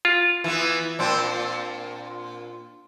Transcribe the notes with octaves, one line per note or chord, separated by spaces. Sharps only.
F4
E3 B3
A#2 C4 D4